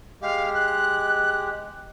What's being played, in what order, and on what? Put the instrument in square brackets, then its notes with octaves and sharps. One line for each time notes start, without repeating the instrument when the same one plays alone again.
[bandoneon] G#3 G4 [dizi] F5
[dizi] F#6